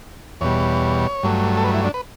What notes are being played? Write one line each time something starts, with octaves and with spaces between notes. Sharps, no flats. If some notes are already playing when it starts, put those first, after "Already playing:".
E2 B2 G3 C#5
G2 F#3 A3
A4
B4
E4
D4
B4